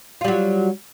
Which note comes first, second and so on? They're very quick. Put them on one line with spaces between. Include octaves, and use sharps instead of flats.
F4 G3 F#3